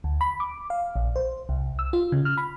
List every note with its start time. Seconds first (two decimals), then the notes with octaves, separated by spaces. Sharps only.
0.04 D2
0.21 B5
0.40 D6
0.70 F5
0.96 A#1
1.16 C5
1.49 C2
1.79 E6
1.93 F4
2.12 C#3
2.25 F6
2.37 B5